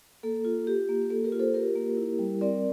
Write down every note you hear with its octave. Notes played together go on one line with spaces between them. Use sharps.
A#3 A4
F4
F4 G4
A#3
A#3 A4
G4 A#4
F4
A4 C5
F4 G4 A#4
A#3
E4
G3
C4 A#4 D5